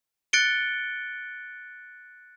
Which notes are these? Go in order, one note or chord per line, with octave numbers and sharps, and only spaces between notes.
F#6 A6 C#7 D7 G7